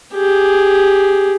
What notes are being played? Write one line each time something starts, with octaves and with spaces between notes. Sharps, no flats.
G4 G#4